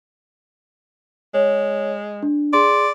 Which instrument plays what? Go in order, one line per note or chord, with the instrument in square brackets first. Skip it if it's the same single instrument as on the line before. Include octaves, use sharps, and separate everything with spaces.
[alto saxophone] G#3 [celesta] C#5
[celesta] D4
[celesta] G#4 C6 [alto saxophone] D5